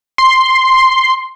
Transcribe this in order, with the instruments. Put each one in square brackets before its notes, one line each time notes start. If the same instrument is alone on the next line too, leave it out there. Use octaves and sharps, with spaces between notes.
[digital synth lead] C6